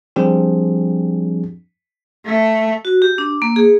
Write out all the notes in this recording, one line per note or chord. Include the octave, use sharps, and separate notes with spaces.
F3 G3 C4 D4 G4 G#4
A3
F#4
G4
D4
A#3
G#4